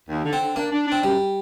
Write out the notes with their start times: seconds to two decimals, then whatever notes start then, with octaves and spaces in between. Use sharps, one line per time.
0.09 D#2
0.25 D3
0.33 C4
0.41 D3
0.56 A#3 D4
0.72 D4
0.88 C4 D4
1.03 F#2 G3